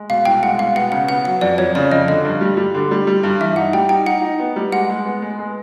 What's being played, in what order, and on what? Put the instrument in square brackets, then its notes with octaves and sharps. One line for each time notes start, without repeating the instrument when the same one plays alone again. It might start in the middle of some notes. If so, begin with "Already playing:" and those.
Already playing: [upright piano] G#3
[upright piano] B2 [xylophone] F5
[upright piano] C2 [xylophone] G5
[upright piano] G#3 [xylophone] F#5
[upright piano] B2 [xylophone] F5
[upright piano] B3 [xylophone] F#5
[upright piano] C#3 [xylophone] F#5
[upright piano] B3 [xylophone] F#5
[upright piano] F#3 [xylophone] F#5
[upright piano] F2 [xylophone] D5
[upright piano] F2 [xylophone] C#5
[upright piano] C#3 [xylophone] D5
[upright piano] F2 [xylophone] D#5
[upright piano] D3 [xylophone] D#5
[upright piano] G2
G3
G3
D3
G3
G3
G2
[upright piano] E3 [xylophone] E5
[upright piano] D#4 [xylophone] F#5
[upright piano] G3 [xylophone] G5
[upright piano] D#4 [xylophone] G5
[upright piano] D#4 [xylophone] F#5
[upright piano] D#4
B3
G3
[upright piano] G#3 [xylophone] F#5
[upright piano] G#3
B3
G#3
G#3